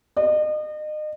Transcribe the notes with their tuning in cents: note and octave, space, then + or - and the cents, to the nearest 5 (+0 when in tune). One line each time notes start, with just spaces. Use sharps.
D#5 -35